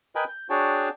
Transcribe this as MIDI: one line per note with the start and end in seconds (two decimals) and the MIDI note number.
0.16 0.24 70
0.16 0.24 71
0.16 0.24 75
0.16 0.24 79
0.16 0.24 80
0.16 0.24 83
0.28 0.47 91
0.50 0.89 62
0.50 0.89 66
0.50 0.89 68
0.50 0.89 73
0.50 0.89 79
0.50 0.89 81